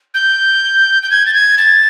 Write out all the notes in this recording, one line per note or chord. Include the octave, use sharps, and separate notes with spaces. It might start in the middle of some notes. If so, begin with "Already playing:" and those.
G6
G6
G#6
A6
G#6
A6